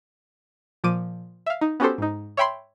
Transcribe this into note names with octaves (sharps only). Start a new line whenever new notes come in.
A#2 F3 D6 D#7
E5 F5
D#4
B3 C#4 F#4 G4 A4 C5
G#2 D#4
C#5 E5 G5 B5 C6